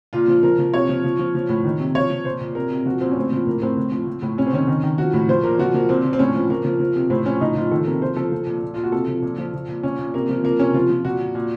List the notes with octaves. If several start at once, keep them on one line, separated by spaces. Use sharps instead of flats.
A#2 F4
F3
F3 A#4
F3
C3 C#5
F3
F3
F3
F3
A2
D#3
C3
F3 C#5
F3
A#2 C5
A#2
C3 A#4
C3
F3 F#4
A#2 C4
C#4
A2 C4
F3
A2 A#3
A2 C4
A2
F3
F3
A2
C3 C#4
C4
D#3 C#4
D#3
D#3
F3 F#4
A2
F3 C5
A#2 A#4
F3 F#4
F3 A#3
A#2 C4
F3
C4
A2 C#4
F3
F3 A#3
F3
F3
C3
A2 C4
F3 C#4
A2 D#4
F3 F4
D#3 A4
C3 A#4
F3 C5
F3 A4
F3
A#2
A#2
A#2 F4
F#4
C3 A4
F3
A#2
F3
F3
A#2
A#2 C#4
A#2
C3 A#3
F3
F3 A#3
C3 C#4
F3 F4
F3
A#2 F#4
A#2
A#2